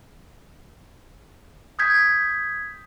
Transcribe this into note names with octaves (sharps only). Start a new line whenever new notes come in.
D#6 G6 G#6 B6